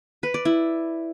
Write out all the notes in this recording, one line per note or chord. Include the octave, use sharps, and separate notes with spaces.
B4
D5
E4